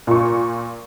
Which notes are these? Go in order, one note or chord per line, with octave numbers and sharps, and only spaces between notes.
A#2 C#6